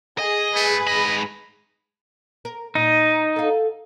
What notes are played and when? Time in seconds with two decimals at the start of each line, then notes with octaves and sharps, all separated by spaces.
0.18 G#4 D#5
0.56 A3 B4
0.87 G#2 D#5 B5
2.45 A#4
2.75 A#2 D#4
3.36 A4 F5